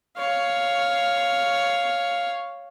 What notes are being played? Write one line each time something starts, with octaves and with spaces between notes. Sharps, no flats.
C#5 F5